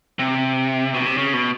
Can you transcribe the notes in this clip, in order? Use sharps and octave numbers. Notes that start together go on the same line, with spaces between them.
C3
B2
C3
C#3
B2